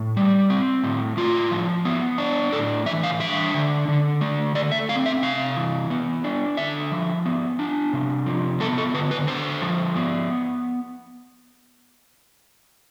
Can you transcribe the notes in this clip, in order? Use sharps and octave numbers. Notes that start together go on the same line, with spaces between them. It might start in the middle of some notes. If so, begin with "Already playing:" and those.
Already playing: A2
G3
C4
A2
A2 F4
F3
B3
D4
A2 A4
E3 E5
F5
D4 E5
D3
D3
A3
A3 D5
E5
C4 F5
E5
C3 F5
E3
B3
D4
D3 E5
F3
B3
D4
C3
F3
B3 A4
A4
D3 B4
B4
D3 C5
F3
B3